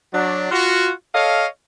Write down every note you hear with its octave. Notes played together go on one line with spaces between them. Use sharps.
F#3 D4
F4 F#4
A4 C#5 D#5 F5